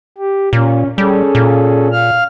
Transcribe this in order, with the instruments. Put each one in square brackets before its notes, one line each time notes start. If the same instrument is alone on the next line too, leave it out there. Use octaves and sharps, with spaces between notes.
[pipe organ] G4
[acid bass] A#2 [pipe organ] C#4
[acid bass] G3 [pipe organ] C#4 G#4 A4
[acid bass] A#2
[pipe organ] F5 F6